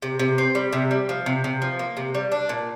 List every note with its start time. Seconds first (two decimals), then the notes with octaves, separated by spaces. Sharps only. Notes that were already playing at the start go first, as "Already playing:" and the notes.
0.02 C3
0.19 C3
0.38 C4
0.55 G3
0.73 C3
0.91 G3
1.09 F3
1.26 C3
1.44 C3
1.62 F3
1.79 A#3
1.97 C3
2.15 G3
2.32 D4
2.49 A#2